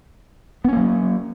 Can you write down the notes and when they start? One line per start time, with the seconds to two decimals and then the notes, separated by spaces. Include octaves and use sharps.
0.65 B3
0.69 C#4
0.73 A#3
0.77 F#3